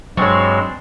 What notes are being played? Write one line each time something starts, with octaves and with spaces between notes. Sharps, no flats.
G2 F#3 G#3 C4 D4 F#4 C#5